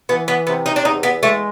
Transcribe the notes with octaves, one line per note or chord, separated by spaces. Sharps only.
E3 B3
B3
C3 B3
D#4
D4
E2 D#4
B3
G#3 A3